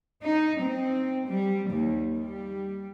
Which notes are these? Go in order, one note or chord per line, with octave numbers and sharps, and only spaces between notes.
D#4
C4
G3
D#2
G3